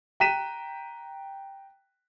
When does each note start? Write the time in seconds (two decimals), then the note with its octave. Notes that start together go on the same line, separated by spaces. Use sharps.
0.20 G5 A#5 F#6 B6 D#7 E7